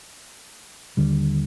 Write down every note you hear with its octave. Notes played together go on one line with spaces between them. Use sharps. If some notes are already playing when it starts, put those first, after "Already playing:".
D#2 D3 G3